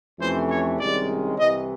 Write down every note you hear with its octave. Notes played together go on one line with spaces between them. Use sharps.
F2 C3 E3 A3 C#4 C5
C#5
C2 C3 D#3 G#3 C#4 D5
C2 C3 E3 D#5